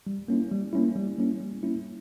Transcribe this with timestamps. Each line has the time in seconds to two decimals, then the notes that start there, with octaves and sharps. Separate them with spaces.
0.07 G3
0.28 A#3 C#4 E4
0.52 G3
0.73 A#3 C#4 E4
0.96 G3
1.19 A#3 C#4 E4
1.40 G3
1.63 A#3 C#4 E4